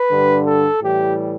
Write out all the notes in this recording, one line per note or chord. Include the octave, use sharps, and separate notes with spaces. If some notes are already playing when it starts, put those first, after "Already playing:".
Already playing: B4
G2 D3 G3
A4
A2 E3 G3 G4